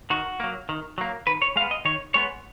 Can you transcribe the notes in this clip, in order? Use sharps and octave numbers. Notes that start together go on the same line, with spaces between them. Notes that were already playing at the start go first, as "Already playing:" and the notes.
D#3 F#4
F#3 A#3
D#3
F#3 A#3
D#3 B4
C#5
G#3 B3 F5
D#5
D#3 C#5
G#3 B3 C#5